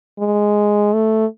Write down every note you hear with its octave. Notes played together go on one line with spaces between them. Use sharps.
G#3
A3